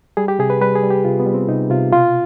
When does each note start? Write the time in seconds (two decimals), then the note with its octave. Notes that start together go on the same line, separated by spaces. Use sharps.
0.17 G3 G#4
0.28 G4
0.39 C3 G#4
0.50 B4
0.61 G3 B4
0.75 G#4
0.83 G3
0.90 G4
1.05 C3 F4
1.20 B3
1.26 G3
1.34 C4
1.49 C3 D#4
1.70 C3 F4
1.92 B2 F4